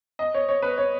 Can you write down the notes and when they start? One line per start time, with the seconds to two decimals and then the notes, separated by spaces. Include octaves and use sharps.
0.19 D#5
0.34 C#5
0.49 C#5
0.62 B4
0.78 C#5